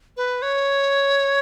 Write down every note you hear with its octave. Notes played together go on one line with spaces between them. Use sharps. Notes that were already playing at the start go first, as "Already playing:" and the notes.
B4
C#5